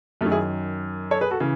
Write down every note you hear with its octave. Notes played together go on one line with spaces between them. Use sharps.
F#2 D#3 A3 C#4
E4 G#4
A4 C#5
G#4 B4
F#4 A4
C#3 E3